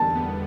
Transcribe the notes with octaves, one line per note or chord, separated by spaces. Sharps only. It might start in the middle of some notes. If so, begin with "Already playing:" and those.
Already playing: E2 D3 G3 A5
B3